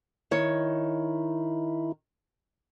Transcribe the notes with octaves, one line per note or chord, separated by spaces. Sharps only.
D#3 E4 C#5